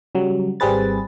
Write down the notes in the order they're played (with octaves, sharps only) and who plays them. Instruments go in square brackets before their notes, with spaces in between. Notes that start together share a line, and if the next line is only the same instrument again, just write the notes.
[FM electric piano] C#3 F#3 G3
G#1 G3 C4 G#4 B4 A6